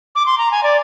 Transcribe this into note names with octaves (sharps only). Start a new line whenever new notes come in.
D6
C6
A#5
G#5
D5